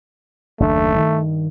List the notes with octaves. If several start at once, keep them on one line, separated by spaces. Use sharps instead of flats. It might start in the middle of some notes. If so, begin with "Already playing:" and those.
F#1 D#2 A3 D4
G2 D#3